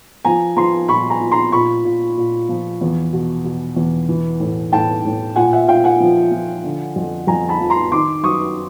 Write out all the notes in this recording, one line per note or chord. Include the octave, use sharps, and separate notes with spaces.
F3 G#5 A#5
F3 A#5 C6
A#2 B5 C#6
G#5 A#5
A#2
A#5 C6
A#2 B5 C#6
A#2
A#2
F3
E2
B2
B2
E2
E3
A2
A2 G5 A5
A2
A#2 F#5 G#5
E5 F#5
A#2 F5 G5
F#5 G#5
F3
F3
D3
F2
F2 G#5 A#5
A5 B5
F3
A#5 C6
D#3 C6 D6
F#2 C#6 D#6